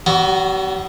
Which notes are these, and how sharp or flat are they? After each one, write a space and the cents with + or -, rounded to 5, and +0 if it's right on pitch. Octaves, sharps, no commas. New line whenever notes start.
G3 -45 B3 +0 F#4 +0